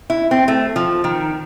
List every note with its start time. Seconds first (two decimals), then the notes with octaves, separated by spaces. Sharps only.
0.10 E4
0.31 C4
0.48 A3
0.76 F3
1.04 D#3